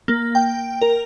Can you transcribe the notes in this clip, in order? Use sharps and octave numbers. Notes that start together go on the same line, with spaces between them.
A#3
G5
A#4